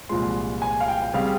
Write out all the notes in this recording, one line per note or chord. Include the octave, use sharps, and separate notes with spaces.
C2 A#2 F3 G#3 C6
G#5
F5
G5
G5
C#3 G3 C4 F5